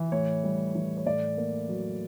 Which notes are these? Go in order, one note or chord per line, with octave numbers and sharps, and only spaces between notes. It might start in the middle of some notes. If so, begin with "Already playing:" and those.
Already playing: E3
A2 C#5
G3
E3
C#5
A2 D5
A#3
F#3